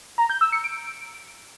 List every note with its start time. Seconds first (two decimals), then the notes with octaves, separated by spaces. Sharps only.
0.18 A#5
0.30 G6
0.41 E6
0.52 C#7
0.64 D7